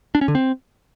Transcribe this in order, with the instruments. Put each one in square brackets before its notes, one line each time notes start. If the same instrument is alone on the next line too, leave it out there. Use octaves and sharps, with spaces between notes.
[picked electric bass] D4
C#4
D3
C4